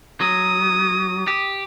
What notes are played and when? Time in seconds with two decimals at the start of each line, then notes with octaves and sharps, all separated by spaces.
0.21 F#3 D#6
1.28 G4